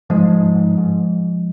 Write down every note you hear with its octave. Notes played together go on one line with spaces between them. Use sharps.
G#2 F3 G#3
G#2
G#2
G#2